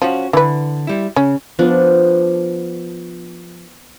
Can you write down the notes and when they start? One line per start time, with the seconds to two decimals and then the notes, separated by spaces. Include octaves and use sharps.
0.02 F3 C#4 F#4
0.33 D3 E3 B4
0.87 G3 E4
1.16 C#3 C#4
1.59 F3 B3 D4